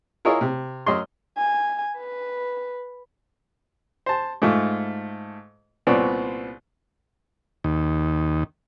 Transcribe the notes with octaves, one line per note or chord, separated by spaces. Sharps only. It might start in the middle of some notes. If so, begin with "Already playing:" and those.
E4 F4 G#4 A#4 C#5 D#5
C3
F#2 D#5 C6
G#5
B4
C5 A5
G#2 A3 F4
C2 A#2 B3 C4 C#5 D5
D#2